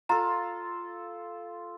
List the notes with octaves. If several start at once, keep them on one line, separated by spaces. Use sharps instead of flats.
F4 A4 A#5